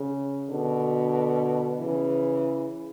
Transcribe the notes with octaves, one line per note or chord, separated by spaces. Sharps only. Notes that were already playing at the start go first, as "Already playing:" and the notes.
Already playing: C#3
B2 D3
C#3 E3